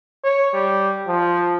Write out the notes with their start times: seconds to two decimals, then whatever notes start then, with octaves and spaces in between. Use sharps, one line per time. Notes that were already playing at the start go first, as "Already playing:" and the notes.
0.24 C#5
0.53 G3
1.08 F3